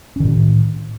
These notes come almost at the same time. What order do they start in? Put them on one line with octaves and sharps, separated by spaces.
C#4 D#3 A2